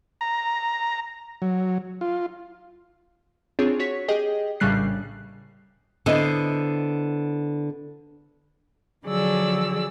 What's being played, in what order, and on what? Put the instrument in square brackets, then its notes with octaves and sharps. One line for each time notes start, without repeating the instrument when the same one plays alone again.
[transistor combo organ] A#5
F#3
F4
[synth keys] C4 D4 F4 G#4 C#5
F#4 C#5 B6
G4 G#4 D#5 G5
A#1 A2 C#3 G3 F#6 C7
[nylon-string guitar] D3 B3 E4 C5 D#5
[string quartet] D3 F3 F#3 G#4 D5 E6